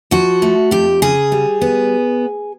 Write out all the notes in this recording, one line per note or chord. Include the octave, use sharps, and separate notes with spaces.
F3 F#4
A3
F2 G4
C#3 G#4
G3
B3